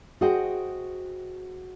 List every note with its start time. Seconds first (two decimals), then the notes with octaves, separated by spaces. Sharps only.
0.21 F#4 G#4 C5 D#5 F#5 G5